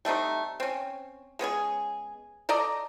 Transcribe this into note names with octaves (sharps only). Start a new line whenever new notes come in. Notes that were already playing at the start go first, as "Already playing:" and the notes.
G3 A3 C4 D#4
C4 C#4
G#3 B3 C#4 G#4
A4 D5 D#5 A#5